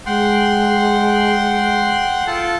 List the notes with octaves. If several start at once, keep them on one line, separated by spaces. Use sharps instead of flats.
G#3 F#5 G5 C6
F4 A4 A5